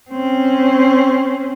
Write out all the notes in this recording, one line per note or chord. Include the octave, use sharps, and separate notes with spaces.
C4 C#4